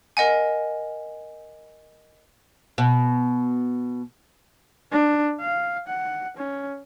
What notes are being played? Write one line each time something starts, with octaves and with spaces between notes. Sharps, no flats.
A#4 D#5 F#5 G#5
B2
D4
F5
F#5
C#4